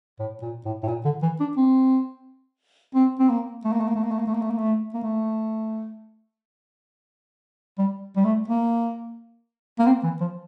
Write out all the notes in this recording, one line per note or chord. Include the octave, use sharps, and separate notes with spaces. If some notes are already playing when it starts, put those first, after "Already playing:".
A2
A#2
A2
A2
A#2
D3
E3
D4
C4
C4
C4
A#3
A3
A#3
A3
A#3
A3
A#3
A3
A#3
A3
A#3
A3
A#3
A3
A#3
A3
G3
G3
A3
A#3
A#3
C4
E3
F3